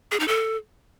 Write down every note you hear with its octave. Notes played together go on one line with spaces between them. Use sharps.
G#4
D#4
A4